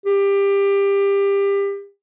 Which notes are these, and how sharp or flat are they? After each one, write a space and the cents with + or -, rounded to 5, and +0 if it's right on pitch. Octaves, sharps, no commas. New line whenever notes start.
G4 +25